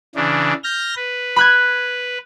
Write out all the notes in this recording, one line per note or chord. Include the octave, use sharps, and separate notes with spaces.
C#3 E3 D4
F6 G6 A#6
B4
B5 F#6 G#6